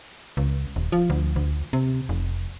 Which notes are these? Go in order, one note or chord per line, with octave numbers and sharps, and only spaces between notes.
C#2
D#1
F3
D2
D2
C3
F1